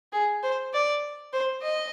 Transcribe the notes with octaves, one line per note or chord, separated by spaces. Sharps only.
G#4
C5
D5
C5
D#5